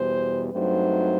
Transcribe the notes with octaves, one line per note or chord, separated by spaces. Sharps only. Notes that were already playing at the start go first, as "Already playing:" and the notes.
Already playing: E2 B2 G3 C5
G2 F#3 A3 C4 D#4 C5